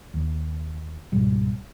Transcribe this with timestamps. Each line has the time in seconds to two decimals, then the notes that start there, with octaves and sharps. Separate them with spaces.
0.14 D#2
1.12 C#2 G#2 B2 G3